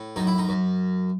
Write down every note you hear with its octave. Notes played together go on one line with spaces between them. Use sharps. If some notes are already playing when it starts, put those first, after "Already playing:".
Already playing: A2
F#2 D#4
E4
D#4
F#2